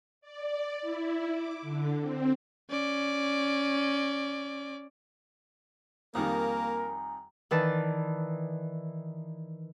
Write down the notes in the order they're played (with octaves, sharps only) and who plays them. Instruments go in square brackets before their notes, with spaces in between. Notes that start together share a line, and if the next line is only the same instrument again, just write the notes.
[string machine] D5
E4
D6
D3
C4
[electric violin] C#4 D5
[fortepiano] F2 D#3 G3 [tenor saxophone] A#3 [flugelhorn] A#4 [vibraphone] G#5 A#5
[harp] D#3 E3 B4 D5 A5